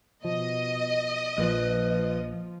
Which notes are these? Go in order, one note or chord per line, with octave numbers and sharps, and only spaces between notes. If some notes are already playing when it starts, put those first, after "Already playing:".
B2 F3 D#5
A#1 A#2 F3 B4